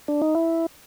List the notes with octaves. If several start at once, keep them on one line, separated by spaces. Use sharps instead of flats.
D4
D#4
E4